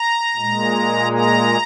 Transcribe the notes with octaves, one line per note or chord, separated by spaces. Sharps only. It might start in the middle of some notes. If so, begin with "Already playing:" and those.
Already playing: A#5
A#2 G#3
A#5